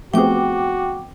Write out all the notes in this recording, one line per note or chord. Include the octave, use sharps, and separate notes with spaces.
F3 A3 B3 C4 F#4 G#4 G5 D6